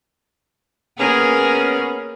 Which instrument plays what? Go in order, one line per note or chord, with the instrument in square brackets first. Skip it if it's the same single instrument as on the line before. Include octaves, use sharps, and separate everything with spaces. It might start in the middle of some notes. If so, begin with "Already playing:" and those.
[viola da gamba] A#3 G#4 A#4 [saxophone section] B3 C#4